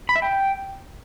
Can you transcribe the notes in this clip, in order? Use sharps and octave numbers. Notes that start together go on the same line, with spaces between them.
B5
E5
G5